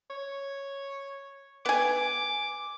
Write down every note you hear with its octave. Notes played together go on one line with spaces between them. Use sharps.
C#5
B3 G#5 D6